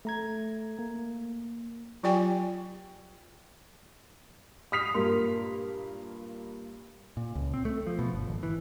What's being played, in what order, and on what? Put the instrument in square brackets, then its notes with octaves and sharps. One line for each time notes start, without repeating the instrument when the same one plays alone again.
[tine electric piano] A3 A#5 G#6
A#3
[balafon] F#3 F4 G4 D5 G5 G#5
[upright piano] D#6 F6 B6 C7 F7
G2 A#2 A#3 A#4 C6
[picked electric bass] A#2
C#2
C4
A3
F3
B2
G1
G#1
E3